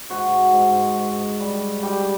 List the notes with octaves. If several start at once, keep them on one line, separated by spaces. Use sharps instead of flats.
G#2 F#4
G#2
G#2
G3
G3 G4